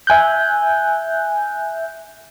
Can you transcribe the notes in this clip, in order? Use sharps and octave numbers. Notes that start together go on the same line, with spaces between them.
E5 G#5 F#6 G6